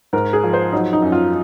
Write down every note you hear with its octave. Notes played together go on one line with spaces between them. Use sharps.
G#2 A#4
G#4
F3
C5
F#3 D#4
D#4
F#2
F4